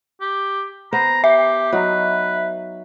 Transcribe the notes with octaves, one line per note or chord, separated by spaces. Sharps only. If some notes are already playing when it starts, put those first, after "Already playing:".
G4
B3 C5 A#5
G4 E5
F#3 D#4 B4